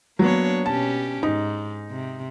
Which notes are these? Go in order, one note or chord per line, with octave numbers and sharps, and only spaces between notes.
F#3 A#3 B3 D4 C#5
B2 C#4 G4 A5
G#2 D#4
C3